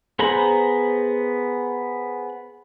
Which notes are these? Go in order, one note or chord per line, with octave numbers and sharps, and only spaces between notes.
B3 G#4 C5 A#5 B5